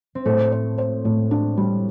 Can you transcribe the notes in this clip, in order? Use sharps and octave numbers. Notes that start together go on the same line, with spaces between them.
C4
A2 A3
C5
C5
A2
D4
G3